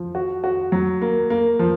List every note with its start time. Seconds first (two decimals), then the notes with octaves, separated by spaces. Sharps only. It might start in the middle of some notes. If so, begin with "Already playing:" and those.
Already playing: F3
0.15 F#4
0.44 F#4
0.72 F#3
1.02 A#3
1.30 A#3
1.59 F3